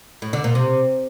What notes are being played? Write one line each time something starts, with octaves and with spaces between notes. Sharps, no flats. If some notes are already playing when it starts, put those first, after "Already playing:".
A2
D3
A#2
C3